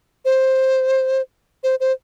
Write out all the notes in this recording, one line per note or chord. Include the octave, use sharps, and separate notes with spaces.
C5
C5
C5